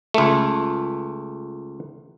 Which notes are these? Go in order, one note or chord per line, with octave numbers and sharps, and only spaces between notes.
C#2 A3